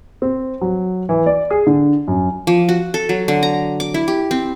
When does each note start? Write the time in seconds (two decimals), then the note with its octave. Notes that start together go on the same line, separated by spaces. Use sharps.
0.22 C4
0.61 F#3
1.09 E3
1.26 D5
1.50 G#4
1.67 D3
2.08 F#2
2.47 F3
2.69 F#4
2.94 A4
3.09 F#3
3.28 D3
3.43 A#5
3.80 D6
3.94 E4
4.08 G4
4.31 C4